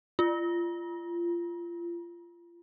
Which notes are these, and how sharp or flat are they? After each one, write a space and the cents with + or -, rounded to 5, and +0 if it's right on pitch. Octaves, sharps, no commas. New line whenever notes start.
F4 -25